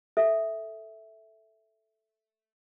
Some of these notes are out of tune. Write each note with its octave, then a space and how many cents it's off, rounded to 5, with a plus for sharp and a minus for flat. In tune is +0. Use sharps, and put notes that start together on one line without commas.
A4 +0 E5 -5